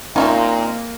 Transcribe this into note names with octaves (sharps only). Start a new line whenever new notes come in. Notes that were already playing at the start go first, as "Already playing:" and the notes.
A#2 A#3 C4 C#4 D#4 F4 E5